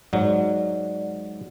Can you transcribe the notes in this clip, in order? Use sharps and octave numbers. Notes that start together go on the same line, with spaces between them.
G#2 F#3 D5 F#5